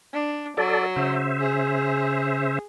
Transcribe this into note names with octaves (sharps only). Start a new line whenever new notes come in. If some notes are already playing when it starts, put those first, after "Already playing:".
D4
F#3 A4 D5
C#3 C5 E5
G#4